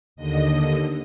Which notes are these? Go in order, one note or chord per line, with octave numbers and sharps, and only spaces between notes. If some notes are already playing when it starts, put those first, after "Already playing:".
D#2 D3 D#5